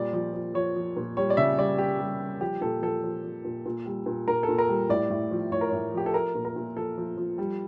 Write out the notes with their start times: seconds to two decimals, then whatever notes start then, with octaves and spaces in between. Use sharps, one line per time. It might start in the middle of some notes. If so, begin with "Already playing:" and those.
Already playing: A#2 G3 D5
0.13 F3
0.33 F3
0.54 F3 C#5
0.76 F3
0.96 A#2
1.17 G3 C#5
1.30 D5
1.37 C#3 E5
1.58 G3 D5
1.78 G3 G4
1.99 G3
2.21 G3
2.40 F3 G4
2.61 A#2 A4
2.82 F3 A4
3.03 F3
3.24 F3
3.45 A#2
3.66 A#2
3.86 G3
4.06 A#2
4.28 A#2 A#4
4.43 A4
4.49 A#2
4.58 A#4
4.69 G3
4.89 A2 D5
5.10 A2
5.31 F3
5.52 A2 C#5
5.61 A#4
5.70 A2 C#5
5.94 F3 G4
6.06 A4
6.14 F3 A#4
6.35 A#2
6.45 A#4
6.56 A#2
6.75 F3 A4
6.97 F3
7.17 F3
7.38 G3